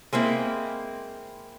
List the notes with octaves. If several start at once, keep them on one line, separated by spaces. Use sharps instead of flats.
G#3 A#3 C4 E4